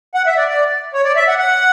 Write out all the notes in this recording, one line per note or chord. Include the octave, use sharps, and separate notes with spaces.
F#5
E5
D5
D5
C#5
D5
E5
F#5
F#5